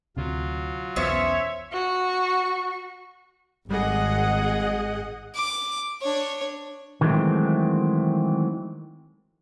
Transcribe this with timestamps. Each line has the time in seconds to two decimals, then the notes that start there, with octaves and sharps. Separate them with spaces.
0.16 D2 C3 F#3 F4
0.96 B1 E2 B3 C#4 C5 C#5 E5
1.72 F#4 C#6
3.70 G#1 G3 G#4 D#5 F#5
5.35 D6
6.02 D4 C#5
7.01 D#3 E3 F#3 G#3 A3 C4